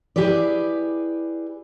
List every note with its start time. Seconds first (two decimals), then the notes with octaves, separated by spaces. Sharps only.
0.16 E4 G4 G#4 B4 D5